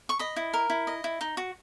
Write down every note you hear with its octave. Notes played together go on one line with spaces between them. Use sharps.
C#6
D#5 B5
E4
A#4
E4
D#5
E4
D#4
F#4